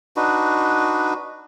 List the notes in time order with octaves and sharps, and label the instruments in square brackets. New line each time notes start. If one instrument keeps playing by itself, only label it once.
[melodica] D4 D#4 F#4 B4